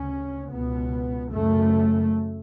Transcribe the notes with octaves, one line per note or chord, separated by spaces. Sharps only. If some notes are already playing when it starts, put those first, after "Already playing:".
Already playing: D2 C#3 C#4
C#2 B2 B3
F#2 C#3 A3